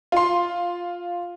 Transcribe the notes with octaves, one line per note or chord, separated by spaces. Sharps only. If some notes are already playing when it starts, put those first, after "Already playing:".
F4 C6